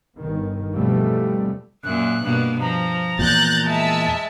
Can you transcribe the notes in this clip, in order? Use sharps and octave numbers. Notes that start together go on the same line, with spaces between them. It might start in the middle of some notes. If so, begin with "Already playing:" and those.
G1 D#3
E2 B2 F3 G3 A3 C4
F#2 A#2 F#6
G2 B2 A#3
F3 A#5
E2 A#2 F#6 G6 A6
G#3 E5 A5